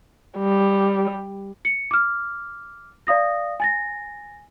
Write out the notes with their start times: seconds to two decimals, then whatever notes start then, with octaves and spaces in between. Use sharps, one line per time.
0.38 G3
1.65 C#7
1.91 D6 F6
3.07 D5 F5 D#6 A#6
3.60 G#5 A6 A#6